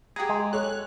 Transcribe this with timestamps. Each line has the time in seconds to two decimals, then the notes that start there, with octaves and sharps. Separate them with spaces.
0.16 G4 G#4 F#5 A#5
0.29 G#3
0.53 A4 C#5 F#6